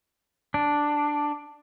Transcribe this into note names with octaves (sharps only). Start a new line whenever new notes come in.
D4